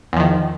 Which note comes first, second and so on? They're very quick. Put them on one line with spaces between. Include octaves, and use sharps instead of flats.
E2 F3 D#3